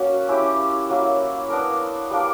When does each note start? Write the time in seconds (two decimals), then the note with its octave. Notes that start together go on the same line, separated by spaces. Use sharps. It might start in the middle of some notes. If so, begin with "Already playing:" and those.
Already playing: F#3 A#3 C#4 F#4
0.29 C#4 E4 G4
0.90 F#3 A#3 E4
1.50 B3 D4 A#4
2.10 G3 A#3 D4 A#4